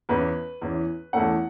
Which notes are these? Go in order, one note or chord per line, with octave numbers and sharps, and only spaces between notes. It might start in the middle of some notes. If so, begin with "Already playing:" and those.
E2 E3 C#4 B4
E2 E3 C#4
E2 E3 A3 C#4 F#5